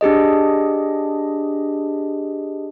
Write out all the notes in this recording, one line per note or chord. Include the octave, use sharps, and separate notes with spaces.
D4 G4 G#4 D#5